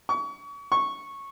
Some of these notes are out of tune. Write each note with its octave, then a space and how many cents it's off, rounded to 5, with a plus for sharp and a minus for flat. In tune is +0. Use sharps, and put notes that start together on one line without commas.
C#6 +35
C#6 -10